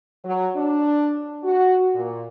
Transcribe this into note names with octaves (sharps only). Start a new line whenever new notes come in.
F#3
D4
F#4
A#2